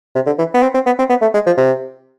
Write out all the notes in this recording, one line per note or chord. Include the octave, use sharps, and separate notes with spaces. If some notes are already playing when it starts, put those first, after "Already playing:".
C3
D3
E3
B3
C4
C4
B3
C4
B3
A3
G#3
F3
C3